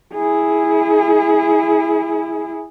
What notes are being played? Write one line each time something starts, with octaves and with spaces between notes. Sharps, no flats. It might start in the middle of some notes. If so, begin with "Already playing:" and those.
E4 G#4